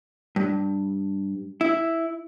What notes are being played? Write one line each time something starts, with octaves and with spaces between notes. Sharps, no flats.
G2
E4